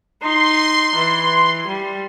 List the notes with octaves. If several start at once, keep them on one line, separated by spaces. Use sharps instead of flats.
D#4 C6
E3
G3